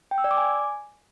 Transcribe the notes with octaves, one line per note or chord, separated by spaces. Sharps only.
G5
E6
D5
D6
G#5